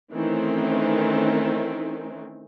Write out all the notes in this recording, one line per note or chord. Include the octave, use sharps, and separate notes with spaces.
D#3 E3 A3 C4 C#4